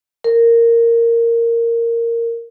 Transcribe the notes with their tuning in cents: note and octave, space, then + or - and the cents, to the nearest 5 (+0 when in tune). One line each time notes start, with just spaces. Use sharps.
A#4 -10